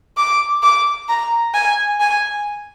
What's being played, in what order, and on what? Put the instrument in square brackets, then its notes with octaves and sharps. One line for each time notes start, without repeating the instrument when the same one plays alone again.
[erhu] D6
D6
A#5
G#5
G#5